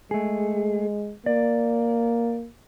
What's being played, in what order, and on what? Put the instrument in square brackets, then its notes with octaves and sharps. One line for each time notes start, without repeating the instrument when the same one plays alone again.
[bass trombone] G#3 [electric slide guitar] A3 G#4
[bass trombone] A#3 [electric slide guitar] D5